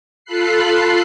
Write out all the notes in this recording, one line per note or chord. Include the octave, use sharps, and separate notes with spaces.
F4 A4 B5 F#6 C7